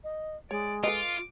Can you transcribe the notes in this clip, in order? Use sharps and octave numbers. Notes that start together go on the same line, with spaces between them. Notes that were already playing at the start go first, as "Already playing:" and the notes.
D#5
G#3 C#5 D5
F4 A4 B4 D#5 D6